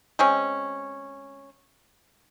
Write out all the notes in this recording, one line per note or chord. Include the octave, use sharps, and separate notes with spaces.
G#3 C4 C#4